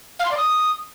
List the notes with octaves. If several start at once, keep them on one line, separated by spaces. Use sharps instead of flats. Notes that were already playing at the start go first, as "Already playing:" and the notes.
F5
C6
D5
D#6